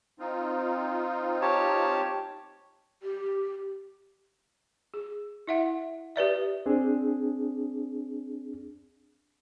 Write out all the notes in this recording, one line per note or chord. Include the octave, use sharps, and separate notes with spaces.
C4 D#4 F4
G4 C#5 A5
G4
G#4
E4 E5 F#5
G4 B4 D5 E5
C4 D4 G#4